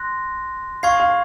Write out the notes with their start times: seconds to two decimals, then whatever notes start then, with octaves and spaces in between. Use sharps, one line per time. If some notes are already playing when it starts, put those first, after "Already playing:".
Already playing: C6 F#6 A#6
0.83 F5 C#6 G#6 C7
1.00 F5